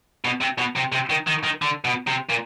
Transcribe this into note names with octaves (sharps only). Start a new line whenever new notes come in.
B2
C3
B2
C3
C3
D#3
D#3
D#3
D3
B2
C3
A#2